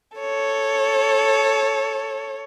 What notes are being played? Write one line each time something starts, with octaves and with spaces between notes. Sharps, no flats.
A4 C#5